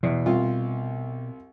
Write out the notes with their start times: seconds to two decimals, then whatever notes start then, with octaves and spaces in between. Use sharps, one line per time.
0.03 E2 B2
0.26 C2 F4